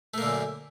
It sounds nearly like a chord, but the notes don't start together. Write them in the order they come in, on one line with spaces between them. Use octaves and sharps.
A3 A#3 D3 F#2